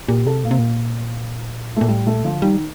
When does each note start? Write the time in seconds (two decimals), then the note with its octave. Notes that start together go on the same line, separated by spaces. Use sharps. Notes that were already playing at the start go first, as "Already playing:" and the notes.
0.08 A#2 G4
0.25 C3 A4
0.44 A#2 A#3
0.51 C3
0.59 A#2
1.76 A#2 A3
1.88 A2 G3
2.06 A#2 A3
2.24 D3 F3
2.42 D#3 G3